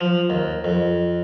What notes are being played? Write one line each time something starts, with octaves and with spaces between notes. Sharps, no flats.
F3
D#2
F2